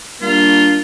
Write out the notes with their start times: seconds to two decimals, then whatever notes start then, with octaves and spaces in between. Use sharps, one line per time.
0.22 G3 A#3 D4 F4